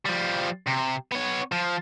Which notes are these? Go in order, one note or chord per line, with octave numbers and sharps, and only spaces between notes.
F3 G3
C3
B3 C#5
F3